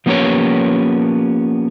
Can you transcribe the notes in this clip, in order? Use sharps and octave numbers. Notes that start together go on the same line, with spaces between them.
F3 A#3 B3 C#4 G4 C#5